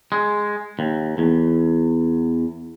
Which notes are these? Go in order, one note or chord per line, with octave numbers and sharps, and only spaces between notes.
G#3
D#2
E2